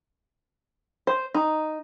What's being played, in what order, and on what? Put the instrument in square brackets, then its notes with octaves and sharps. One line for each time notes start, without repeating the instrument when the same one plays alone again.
[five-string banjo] C5
D#4